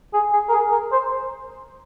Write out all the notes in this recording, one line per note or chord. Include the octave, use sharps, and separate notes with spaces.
G#4
G#4
A#4
G#4
A#4
C5